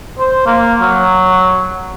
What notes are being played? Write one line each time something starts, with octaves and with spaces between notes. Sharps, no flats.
C5
A#3
F#3